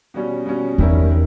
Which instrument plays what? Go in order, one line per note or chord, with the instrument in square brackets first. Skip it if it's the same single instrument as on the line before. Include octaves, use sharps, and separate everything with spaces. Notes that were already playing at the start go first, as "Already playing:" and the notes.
[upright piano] B2 G3 C#4
B2 G3 C#4
[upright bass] E2 [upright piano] D#3 G3 C#4 E4 A#4
[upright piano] D#3